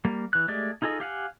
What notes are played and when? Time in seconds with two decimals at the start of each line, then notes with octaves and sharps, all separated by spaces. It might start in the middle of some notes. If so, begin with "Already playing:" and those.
0.05 G3 A#3
0.33 E3 F#6
0.48 G#3 A3 G4 G#4 D5
0.82 D#4 F4 G#4 A4 D#5
1.00 G4 F5 F#5 G#5